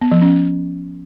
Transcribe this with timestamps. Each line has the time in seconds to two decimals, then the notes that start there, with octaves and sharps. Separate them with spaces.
0.01 B3
0.12 F3
0.22 C#4